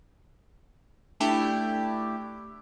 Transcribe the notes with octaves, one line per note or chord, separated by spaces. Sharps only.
A3 D4 E4 G4